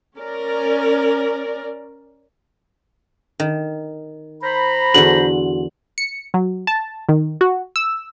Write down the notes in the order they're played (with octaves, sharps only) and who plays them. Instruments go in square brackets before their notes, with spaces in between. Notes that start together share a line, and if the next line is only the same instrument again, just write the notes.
[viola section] C#4 A#4 D5
[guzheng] D#3
[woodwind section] C5 A#5 B5
[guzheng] E2 D3 [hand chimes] F#4 [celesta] F#7
[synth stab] C#7
F#3
A5
D#3
F#4
E6